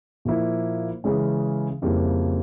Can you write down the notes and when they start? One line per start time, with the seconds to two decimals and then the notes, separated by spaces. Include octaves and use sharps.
0.25 A#2 F3 A#3 E4
1.04 C#3 E3 G#3 C#4
1.82 F2 C#3 G3 A#3 E4